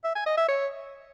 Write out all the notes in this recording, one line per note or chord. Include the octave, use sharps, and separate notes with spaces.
E5
G#5
D#5
E5
C#5